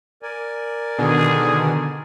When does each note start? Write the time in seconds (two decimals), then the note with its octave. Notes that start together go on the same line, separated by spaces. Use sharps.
0.22 A#4 D5 G#5
0.98 B2 D3 D#3 G#4